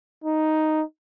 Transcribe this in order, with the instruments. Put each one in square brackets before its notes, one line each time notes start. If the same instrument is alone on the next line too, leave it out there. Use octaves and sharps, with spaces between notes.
[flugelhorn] D#4